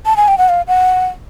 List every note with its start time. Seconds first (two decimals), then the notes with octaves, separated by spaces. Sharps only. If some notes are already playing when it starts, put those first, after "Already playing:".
0.06 A5
0.17 G#5
0.28 G5
0.38 F#5
0.49 F5
0.68 F#5